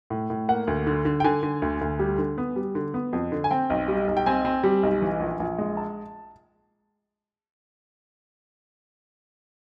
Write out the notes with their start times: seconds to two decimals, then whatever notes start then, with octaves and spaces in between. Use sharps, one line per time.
0.10 A2
0.30 A2
0.48 A#3 F#5
0.67 D2
0.87 D3
1.05 D3
1.20 G5
1.24 D3 G#5
1.43 D3
1.62 D2
1.81 D2
1.99 G3
2.18 D3
2.38 B3
2.56 G3
2.75 D3
2.94 B3
3.13 F2
3.32 D3
3.44 G#5
3.51 C4 G5
3.70 B1
3.88 G3
4.08 B1
4.17 G5
4.26 C4 G#5
4.45 C4
4.64 G3
4.83 B1
5.02 E3
5.20 A#1
5.40 A#1
5.59 G#3
5.77 A5